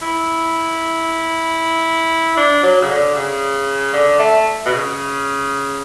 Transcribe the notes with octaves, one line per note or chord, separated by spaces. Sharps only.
E4
D4
F#3
C#3
D3
C#3
D3
A3
B2
C#3